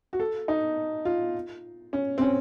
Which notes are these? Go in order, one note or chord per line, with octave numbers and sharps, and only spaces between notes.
F#4
A4
D#4
F4
C#4
C4
C#4